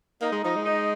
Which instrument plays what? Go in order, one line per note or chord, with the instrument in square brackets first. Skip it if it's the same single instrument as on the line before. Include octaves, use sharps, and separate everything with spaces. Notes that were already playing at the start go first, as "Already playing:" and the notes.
[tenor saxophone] A#3 [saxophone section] D#4
[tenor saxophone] G#3
[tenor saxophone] F3 [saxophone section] D#4
[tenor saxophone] G#3
[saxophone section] D#4